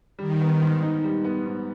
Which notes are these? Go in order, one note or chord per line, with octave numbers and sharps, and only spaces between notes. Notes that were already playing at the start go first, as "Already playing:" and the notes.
D#3 G3
B3
G#2
D#4
G3
B3
G#2